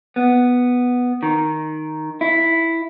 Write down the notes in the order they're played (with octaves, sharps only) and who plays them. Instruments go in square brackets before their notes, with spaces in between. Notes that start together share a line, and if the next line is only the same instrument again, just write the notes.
[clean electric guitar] B3
D#3
E4